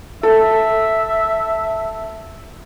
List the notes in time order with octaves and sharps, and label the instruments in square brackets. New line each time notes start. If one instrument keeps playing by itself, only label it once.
[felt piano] A4 [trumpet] E5